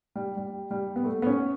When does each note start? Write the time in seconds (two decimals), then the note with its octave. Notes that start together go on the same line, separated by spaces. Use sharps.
0.15 G3
0.37 G3
0.71 G3
0.96 B3
1.05 A3
1.22 B3
1.27 C#4